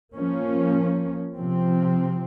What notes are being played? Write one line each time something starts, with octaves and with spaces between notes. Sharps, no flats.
F3 A#3 C#4
C3 F3 C4